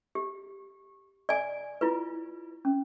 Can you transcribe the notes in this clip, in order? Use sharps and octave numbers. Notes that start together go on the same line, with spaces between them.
G4
D5 G#5
E4 F4 B4
C#4